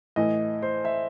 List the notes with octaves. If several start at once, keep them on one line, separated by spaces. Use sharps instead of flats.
A2 E3 A3 D#5
C5
E5